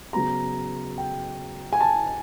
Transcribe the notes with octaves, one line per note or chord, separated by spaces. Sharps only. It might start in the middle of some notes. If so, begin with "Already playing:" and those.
C#3 F#3 B3 A#5
G5
G#5
A5